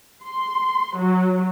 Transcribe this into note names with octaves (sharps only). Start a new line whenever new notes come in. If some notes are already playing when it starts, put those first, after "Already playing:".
C6
F#3